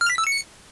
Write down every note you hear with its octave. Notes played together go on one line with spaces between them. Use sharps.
F6
B6
E6
C#7